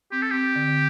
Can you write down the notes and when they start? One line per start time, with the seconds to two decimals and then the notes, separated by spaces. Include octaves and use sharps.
0.12 C4 G4
0.22 A4
0.31 C4 G4
0.56 D3
0.68 D3